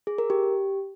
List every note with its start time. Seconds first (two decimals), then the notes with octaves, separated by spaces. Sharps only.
0.07 G#4
0.18 A#4
0.30 G4